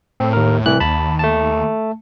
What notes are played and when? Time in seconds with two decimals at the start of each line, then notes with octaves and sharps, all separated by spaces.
0.20 A2 C4 A4
0.33 D#2 A#4
0.66 C2 E3 F#6
0.80 D#2 A5 B5
1.19 A3 A5